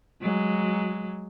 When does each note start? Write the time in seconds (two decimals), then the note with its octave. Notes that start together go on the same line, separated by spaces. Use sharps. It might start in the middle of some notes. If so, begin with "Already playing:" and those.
0.22 F#3 G#3